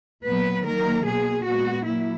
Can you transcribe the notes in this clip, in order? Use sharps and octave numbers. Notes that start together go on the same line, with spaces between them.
A#2 F#3 B3 B4
D#3 F#3 A#3 A#4
B2 A#3 G#4
A#2 G#3 B3 F#4
F#3 A#3 E4